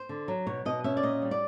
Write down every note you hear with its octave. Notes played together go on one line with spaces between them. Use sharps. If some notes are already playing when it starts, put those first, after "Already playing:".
Already playing: C5
D3
F#3
B2 C#5
B2 D#5
C#4 E5
D5
A#2 D#5
G3
D5